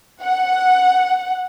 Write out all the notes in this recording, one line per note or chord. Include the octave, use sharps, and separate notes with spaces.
F#5